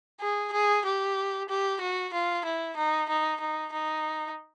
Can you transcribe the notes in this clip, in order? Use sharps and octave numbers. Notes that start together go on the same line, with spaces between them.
G#4
G#4
G4
G4
F#4
F4
E4
D#4
D#4
D#4
D#4